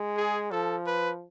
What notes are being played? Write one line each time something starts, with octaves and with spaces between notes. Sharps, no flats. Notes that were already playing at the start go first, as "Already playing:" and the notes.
Already playing: G#3
G#4
F3 A4
B4